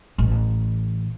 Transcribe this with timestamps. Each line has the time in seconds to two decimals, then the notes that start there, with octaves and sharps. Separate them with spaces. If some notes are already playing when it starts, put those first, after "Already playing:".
0.18 A1